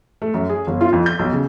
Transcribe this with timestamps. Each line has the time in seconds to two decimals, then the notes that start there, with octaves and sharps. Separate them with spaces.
0.22 A3
0.34 F#2
0.49 G#4
0.67 G1
0.81 F4
0.92 F2
1.06 G6
1.19 B1
1.33 C#3